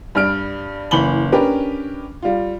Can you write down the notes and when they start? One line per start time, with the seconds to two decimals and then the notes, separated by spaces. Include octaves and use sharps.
0.15 G2 G3 F6 D7
0.91 F#1 E3 B5 F#7 G7
1.32 C#4 D4 G4 A#4 B4
2.22 G3 F4